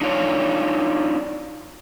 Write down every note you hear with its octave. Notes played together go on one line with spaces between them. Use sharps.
D4 D#4 F4 C#5 D5